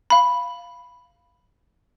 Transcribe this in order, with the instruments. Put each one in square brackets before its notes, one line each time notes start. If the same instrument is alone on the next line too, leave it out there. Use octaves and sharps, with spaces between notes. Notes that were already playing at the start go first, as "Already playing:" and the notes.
[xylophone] F5 B5